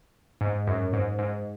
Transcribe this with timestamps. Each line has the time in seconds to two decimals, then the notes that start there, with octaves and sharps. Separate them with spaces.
0.41 G#2
0.67 F#2
0.93 G#2
1.19 G#2